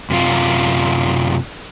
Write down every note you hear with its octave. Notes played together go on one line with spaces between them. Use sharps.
F#2 C3 F4